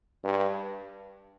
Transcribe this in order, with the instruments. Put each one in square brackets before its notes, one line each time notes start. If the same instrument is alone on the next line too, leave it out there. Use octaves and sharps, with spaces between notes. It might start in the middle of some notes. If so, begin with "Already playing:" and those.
[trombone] G2